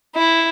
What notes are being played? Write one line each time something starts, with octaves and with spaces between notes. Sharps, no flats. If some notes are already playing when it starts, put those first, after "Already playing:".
E4